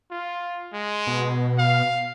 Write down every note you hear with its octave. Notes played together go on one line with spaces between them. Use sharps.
F4
G#3
B2
F5